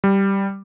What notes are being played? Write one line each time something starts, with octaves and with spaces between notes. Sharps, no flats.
G3